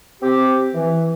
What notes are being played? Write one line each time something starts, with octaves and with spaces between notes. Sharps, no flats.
C4 G4
E3